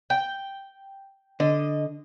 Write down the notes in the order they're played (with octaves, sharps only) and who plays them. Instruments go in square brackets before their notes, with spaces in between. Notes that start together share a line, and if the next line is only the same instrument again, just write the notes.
[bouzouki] G5
[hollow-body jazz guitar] D3 [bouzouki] D#5